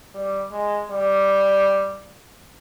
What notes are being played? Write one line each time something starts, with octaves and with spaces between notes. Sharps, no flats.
G3
G#3
G3